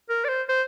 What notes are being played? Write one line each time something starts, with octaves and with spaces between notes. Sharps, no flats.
A#4
D5
C5
C5